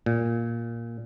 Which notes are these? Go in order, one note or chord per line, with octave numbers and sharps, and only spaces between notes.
A#2